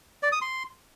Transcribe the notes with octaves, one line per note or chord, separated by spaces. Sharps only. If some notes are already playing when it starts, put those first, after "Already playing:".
D5
D#6
C6